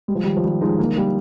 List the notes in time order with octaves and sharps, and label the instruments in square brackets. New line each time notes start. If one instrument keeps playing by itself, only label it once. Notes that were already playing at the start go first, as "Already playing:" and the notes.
[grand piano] G3 [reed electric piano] G#3
[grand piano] F3
[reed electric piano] D#3 [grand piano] G3
[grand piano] F3
[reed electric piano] D#3 [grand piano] G3
[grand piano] F3 G#3 [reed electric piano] D#4
[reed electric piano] D3 [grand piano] G3 A#3
[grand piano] G3 A#3